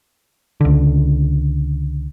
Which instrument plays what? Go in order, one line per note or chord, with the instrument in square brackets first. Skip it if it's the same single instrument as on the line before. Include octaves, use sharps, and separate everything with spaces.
[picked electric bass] C#2 D3